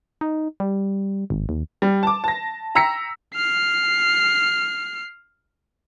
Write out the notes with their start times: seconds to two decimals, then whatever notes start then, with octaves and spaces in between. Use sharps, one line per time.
0.21 D#4
0.60 G3
1.30 G#1
1.49 D#2
1.82 G3
2.03 A5 D6
2.24 A5 A#6
2.75 G5 A#5 E6 A#6 B6 C#7
3.35 F6 C7